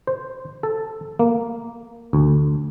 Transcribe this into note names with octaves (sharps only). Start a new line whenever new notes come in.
C5
A4
A#3
D2